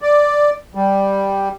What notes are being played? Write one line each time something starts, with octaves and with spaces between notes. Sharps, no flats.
D5
G3